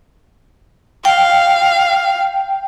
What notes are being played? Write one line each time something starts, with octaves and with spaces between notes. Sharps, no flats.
F5 G5